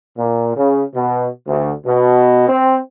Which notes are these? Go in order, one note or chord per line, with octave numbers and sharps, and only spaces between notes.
A#2
C#3
B2
D2
B2
C4